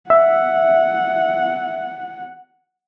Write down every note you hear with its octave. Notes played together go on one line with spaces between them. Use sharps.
E5 F#5